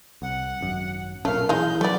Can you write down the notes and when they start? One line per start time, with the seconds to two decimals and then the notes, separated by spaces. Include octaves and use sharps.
0.22 C2 F#5
0.61 G#1 F#2
1.25 B1 A#2 A3 C#4 A#4 F5
1.49 E3 G#3 D#4 E4 G#4 F5 G6
1.81 F#3 A3 B3 D5